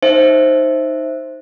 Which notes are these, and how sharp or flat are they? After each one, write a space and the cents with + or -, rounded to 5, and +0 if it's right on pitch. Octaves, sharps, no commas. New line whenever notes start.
D#4 +0 C5 +10 E5 +0